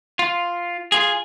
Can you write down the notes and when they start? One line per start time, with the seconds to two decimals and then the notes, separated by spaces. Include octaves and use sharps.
0.19 F4
0.92 F4 G#4